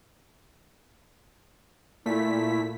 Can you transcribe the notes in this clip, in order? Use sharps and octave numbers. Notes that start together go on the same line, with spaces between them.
A#2 A3 E4 B6